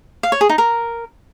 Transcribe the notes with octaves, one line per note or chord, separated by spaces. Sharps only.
F5
C#5
G#4
D#4
A#4